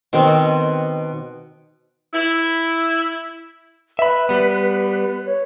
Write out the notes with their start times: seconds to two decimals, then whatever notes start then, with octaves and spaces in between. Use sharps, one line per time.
0.13 B2 D#3 C4
2.13 E4
3.99 B4 E5 B5
4.29 G3 B3
5.25 C#5